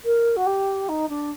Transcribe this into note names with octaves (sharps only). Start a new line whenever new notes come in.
A#4
F#4
G4
D#4
D4